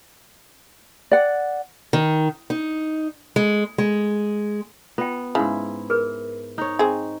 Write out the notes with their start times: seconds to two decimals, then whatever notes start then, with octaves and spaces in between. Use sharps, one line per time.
1.11 D5 F#5
1.93 D#3
2.50 D#4
3.36 G#3
3.78 G#3
4.98 B3 F4 G5
5.35 G#2 C#3 E4
5.90 G#4 A#4 B4
6.58 D#4 C5 C#5
6.79 C4 G#4